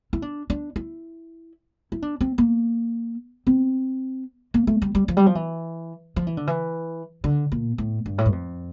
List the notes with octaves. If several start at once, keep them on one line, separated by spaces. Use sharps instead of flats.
E4
D4
D4
E4
E4
D4
C4
A#3
C4
A#3
A3
G3
G3
F3
G3
F3
E3
F3
E3
D3
E3
D3
A#2
A2
G2
A2
G2
F2